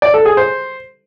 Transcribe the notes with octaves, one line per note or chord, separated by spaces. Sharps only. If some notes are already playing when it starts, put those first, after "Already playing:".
D5
A4
G#4
C5